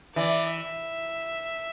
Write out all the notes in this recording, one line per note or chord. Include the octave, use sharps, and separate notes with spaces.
E3 D5
E5